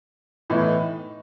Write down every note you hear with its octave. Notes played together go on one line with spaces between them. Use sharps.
A2 E3 B3 D#4